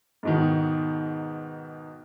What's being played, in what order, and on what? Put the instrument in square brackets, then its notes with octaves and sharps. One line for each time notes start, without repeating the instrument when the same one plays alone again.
[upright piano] G#2 B2 D#3